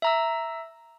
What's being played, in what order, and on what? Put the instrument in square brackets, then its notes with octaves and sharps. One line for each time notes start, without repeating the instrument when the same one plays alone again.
[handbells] E5 A#5 E6